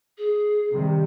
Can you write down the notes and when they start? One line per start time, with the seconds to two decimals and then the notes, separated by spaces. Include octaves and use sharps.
0.18 G#4
0.71 C3 D#3 G3